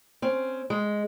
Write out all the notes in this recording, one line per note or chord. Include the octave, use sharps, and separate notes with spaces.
C4 C#4
G#3